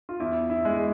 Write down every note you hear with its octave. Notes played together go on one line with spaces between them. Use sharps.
F4
E2 E4
E4
G#3